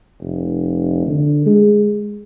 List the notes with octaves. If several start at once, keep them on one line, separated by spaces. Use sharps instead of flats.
F1
D3
G#3